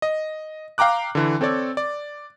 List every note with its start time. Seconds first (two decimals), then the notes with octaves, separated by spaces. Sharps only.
0.02 D#5
0.78 F5 G5 A#5 D6 F#6
1.15 D3 E3
1.41 C4 A4 C#5 D5
1.77 D5